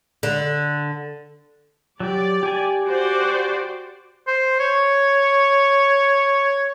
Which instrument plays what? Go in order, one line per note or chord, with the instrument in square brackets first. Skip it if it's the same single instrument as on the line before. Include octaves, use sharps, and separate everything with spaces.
[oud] D3
[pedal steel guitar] F#3 G4 [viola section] D5
[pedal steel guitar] G4 G#5
[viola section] F#4 C5 D5
[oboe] C5
C#5